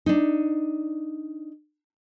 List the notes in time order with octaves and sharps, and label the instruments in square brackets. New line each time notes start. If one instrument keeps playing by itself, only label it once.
[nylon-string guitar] D4 D#4